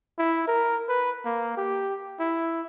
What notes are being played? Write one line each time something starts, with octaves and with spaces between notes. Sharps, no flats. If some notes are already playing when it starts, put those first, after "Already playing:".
E4
A#4
B4
A#3
G4
E4